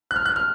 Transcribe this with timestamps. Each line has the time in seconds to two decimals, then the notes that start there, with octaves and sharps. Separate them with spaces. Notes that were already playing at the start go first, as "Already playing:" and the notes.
0.11 F#6
0.16 F6
0.26 F#6
0.36 F6